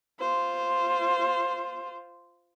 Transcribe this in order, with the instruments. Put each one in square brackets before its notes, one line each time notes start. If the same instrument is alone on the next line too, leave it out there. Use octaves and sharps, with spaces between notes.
[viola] F4 C5